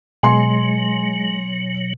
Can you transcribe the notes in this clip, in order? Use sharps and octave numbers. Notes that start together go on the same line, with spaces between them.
B2 F#3 G#3 G#5 C6